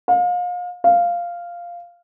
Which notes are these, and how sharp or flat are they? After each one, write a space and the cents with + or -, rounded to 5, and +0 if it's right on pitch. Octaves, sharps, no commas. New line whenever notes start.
F5 +35
F5 -5